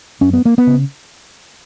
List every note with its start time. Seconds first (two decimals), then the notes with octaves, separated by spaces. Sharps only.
0.21 F#2 C#4
0.33 B3
0.45 A#3
0.58 B3
0.67 C#3